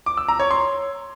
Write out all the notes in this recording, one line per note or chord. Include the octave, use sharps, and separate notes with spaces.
D6
E6
A#5
C#5
C6